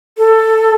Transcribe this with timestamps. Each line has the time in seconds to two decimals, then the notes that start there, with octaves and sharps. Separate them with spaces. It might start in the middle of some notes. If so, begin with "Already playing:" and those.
0.18 A4